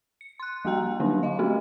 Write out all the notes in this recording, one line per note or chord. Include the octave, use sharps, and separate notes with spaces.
C#7
C6 F#6
F3 G3 A#3 F#4 G5 A#5
D3 F#3 G3 A#3 C#4 D4
D#5 F5
A3 C4 C#4 F#4 G4